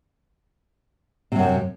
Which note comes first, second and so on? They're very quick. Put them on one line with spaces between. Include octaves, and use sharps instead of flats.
C3 F#3 F#2